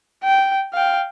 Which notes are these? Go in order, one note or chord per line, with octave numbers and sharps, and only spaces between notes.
G5
F5 G5